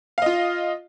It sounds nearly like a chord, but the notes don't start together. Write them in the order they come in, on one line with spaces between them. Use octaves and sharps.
F5 D#5 F4